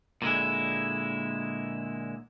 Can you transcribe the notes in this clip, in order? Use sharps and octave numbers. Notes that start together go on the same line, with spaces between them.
A#2 D3 G#3 E4